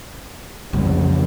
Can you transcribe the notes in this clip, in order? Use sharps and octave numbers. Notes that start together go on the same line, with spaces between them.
F2 C#3 E3 G3